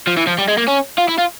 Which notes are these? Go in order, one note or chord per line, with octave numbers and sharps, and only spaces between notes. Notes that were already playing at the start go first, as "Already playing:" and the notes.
F3
E3
F3
G3
G#3
A#3
C#4
F4
E4
F4